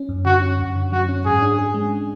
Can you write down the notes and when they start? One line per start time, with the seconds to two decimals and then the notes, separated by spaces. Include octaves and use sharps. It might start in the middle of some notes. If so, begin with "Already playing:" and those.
Already playing: C#4
0.09 F#2
0.25 D3 F#4
0.41 C#4
0.59 F#2
0.76 D3
0.92 F#3 F#4
1.09 C#4
1.25 G#2 G#4
1.42 D4
1.59 G#4
1.74 G#3